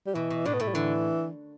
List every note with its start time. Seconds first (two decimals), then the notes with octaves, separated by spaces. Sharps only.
0.07 G3
0.14 B2 E3
0.30 B2
0.45 A2 D4
0.54 B3
0.60 A2 A3
0.67 G3
0.74 D3 E3